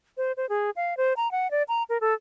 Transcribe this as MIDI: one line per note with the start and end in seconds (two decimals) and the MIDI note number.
0.17 0.32 72
0.37 0.48 72
0.49 0.70 68
0.76 0.97 77
0.97 1.13 72
1.17 1.31 82
1.32 1.50 78
1.51 1.63 74
1.68 1.83 82
1.89 1.98 70
2.01 2.14 69